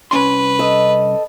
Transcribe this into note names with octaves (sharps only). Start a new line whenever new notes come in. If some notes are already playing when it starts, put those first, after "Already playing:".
C2 C#4 B4 C6
A4 D#5